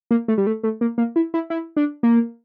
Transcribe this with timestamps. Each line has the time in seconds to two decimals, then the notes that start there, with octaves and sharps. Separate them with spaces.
0.11 A#3
0.28 A3
0.38 G3
0.47 A3
0.63 A3
0.81 A#3
0.98 A#3
1.16 E4
1.34 E4
1.50 E4
1.77 D4
2.03 A#3